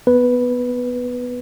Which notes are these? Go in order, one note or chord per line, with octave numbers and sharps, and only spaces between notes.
B3 B4